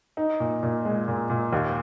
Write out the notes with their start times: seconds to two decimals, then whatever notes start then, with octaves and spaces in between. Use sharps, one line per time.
0.17 D#4
0.40 A#2
0.63 A#2
0.85 G#3
1.08 A#2
1.30 A#2
1.52 D#2